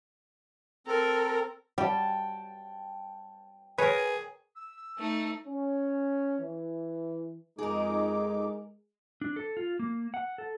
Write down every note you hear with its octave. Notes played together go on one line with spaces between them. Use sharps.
C4 A4 A#4
G3 G5 A5
G#4 A#4 B4 C#5
E6
A3 D#4
C#4
E3
F2 G#3 D#4 G#4 A#4 D6
D4
A4
F4
A#3
F#5
A4